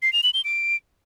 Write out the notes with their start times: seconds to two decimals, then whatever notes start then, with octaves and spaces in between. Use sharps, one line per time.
0.02 C7
0.13 F7
0.23 F#7
0.34 G7
0.44 D7